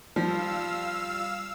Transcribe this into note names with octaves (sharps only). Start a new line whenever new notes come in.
F3 G3 F5 E6